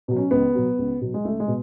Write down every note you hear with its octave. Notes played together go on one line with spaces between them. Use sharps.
B2 F#3
C#4
C#2 B3
B2 F#3
C#2
B2 F#3
G#3
C#2 A3
G#3
B2